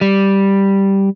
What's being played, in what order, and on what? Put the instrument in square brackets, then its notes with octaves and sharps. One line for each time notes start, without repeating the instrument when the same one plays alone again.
[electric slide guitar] G3